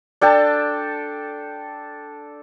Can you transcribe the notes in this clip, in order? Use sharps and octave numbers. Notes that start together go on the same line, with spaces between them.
D4 A4 G5 A5